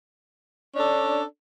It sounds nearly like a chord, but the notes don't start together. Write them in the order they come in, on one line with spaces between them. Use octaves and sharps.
C#4 D4 A4